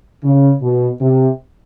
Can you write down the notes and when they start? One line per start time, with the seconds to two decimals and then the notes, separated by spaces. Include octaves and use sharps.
0.24 C#3
0.62 B2
1.01 C3